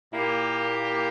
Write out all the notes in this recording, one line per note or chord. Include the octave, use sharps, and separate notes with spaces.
A#2 A#3 E4 G4